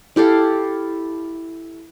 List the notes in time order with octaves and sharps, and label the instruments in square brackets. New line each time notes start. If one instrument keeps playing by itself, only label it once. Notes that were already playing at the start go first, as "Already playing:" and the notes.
[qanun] E4 G4 A4 F5